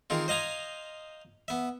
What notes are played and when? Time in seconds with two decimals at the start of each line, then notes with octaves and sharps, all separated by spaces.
0.10 D#3 G#3 C4 F4
0.28 C5 D#5 F5 G#5 A#5
1.48 B3 E5